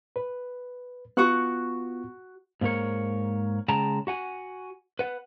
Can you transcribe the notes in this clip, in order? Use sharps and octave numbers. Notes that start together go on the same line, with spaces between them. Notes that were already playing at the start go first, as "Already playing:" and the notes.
B4
B3 F4 F#4 C#6 F#6
G#2 A#3 A#4 C#5
C#3 G#3 G5 A5 A#5
F#4 F#5 G#5
B4 F#5